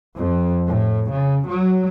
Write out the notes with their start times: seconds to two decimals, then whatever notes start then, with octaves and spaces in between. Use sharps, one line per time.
0.18 F2
0.67 A2
1.10 C#3
1.48 F#3